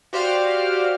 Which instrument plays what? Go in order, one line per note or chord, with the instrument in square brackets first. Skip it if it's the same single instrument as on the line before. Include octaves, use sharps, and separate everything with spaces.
[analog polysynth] F#4 G4 C5 D5 F5 F6